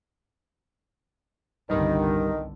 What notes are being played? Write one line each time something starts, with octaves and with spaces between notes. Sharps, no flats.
G1 C2 G2 D3 D#3 G3